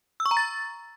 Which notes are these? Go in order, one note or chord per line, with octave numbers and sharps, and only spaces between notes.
E6
C#6
A#5
A6